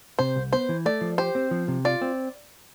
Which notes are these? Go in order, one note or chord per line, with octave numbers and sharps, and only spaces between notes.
C3 C5
C2
B3 C5
E3
A3 D5
F3
G4 C5
C4
F3
C3
F4 D5
C4